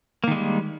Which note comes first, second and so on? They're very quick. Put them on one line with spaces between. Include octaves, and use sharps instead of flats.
A#3 D#3 G#3 G3